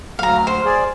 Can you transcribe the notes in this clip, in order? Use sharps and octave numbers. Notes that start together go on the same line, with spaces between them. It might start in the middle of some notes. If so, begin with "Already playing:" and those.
D2 F#3 F5 A#5 F6
C5
G#4 D5